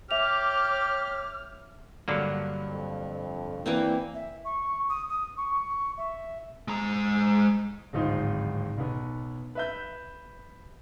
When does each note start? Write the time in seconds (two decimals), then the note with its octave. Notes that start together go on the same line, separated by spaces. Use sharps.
0.11 G4 C#5 E5 D6 F6 F7
2.08 G2 D3 F#3 A#3
2.65 F2
3.66 E3 A#3 C4 D4 E4
4.14 E5
4.45 C#6
4.90 D#6
5.09 D#6
5.37 C#6
5.97 E5
6.68 G#3 A#5
7.93 D1 G#1 G#2 D#4 F4 C5
8.78 B1 B3
9.55 B4 E5 G6